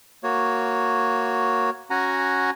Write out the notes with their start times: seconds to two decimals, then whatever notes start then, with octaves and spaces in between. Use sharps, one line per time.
0.23 A#3 F#4 C#5
1.90 C#4 F#4 F#5 G#5 A#5